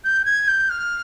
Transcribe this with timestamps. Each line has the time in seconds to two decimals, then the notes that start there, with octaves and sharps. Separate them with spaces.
0.05 G6
0.25 G#6
0.48 G6
0.70 F6